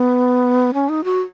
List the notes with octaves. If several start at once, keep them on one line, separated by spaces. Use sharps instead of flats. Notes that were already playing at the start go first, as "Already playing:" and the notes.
Already playing: B3
C#4
D#4
F#4